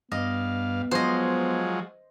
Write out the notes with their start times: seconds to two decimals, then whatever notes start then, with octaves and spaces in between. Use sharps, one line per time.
0.12 G2 B3 D#5 F5
0.91 F3 F#3 G#3 C5 D#5